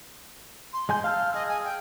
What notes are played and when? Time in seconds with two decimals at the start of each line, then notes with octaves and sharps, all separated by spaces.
0.73 C6
0.89 G#3 G#5 C6 G6
1.04 F5 A5 E6 F6
1.34 G#4 D#5
1.49 G#5
1.64 G5